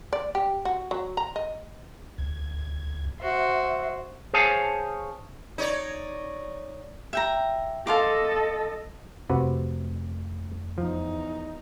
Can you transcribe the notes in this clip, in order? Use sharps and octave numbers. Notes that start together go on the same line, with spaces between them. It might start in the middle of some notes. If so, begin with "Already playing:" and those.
D5
G4
F#4
F#3
A#5
D#5
D2 G#6
F#4 C5 E5
G#4 C5 C#5 F5 G#5 A5
D#4 C#5 D5
E5 G5 A#5
A4 D#5 F5 C6 D6
F2 C3 A3 F#4 B4
E2 F3 D#4